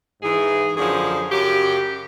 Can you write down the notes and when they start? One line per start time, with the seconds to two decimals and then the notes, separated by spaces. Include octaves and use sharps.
0.22 G#2 E3 G#4
0.77 F#2 D3 F3 G#4
1.32 F#2 C#3 F#3 G4